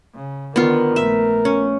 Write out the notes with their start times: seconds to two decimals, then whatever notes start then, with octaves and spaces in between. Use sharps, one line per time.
0.15 C#3
0.56 D3 D#3 B3 F4 A#4
0.96 A#1 A3 E5
1.45 C#4